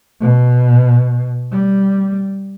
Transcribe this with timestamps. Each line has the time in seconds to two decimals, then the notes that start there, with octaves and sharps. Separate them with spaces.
0.21 B2
1.52 G3